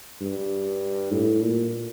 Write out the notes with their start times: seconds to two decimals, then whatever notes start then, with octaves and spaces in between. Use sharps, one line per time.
0.22 G2
1.12 A2
1.42 A#2